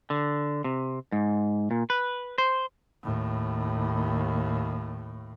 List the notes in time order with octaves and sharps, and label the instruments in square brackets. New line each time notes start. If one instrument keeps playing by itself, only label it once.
[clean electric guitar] D3
C3
G#2
A#2
B4
C5
[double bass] D#2 A2